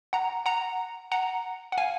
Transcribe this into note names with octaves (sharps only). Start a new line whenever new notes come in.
F#5 A#5
F#5 A#5
F#5 A#5
F#5
F5 G#5